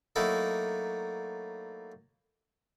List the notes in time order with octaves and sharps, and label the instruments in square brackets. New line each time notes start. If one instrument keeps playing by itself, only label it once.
[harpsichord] F#3 A3 A#3 D#4 E4 A4